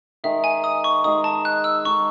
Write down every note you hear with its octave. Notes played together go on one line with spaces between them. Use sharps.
D#3 G#3 D#4 G#4 E5
G#5
D#6
C#6
D#3 G#3 D#4 G#4 D#6
A5
F#6
E6
G#3 D#4 A4 C#6